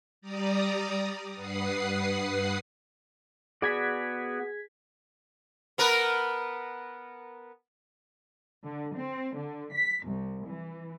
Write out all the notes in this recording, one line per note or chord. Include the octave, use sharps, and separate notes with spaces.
G3 D5 A#5 D#6
G2 B4 F#5 D#6 C7
B3 F#4 G#4 D5 G#6 B6
B3 A#4 B4
D3
C4
D3
B6
C2
E3